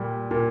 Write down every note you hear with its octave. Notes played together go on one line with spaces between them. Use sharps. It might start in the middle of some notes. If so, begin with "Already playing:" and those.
Already playing: A#2 G3
A#2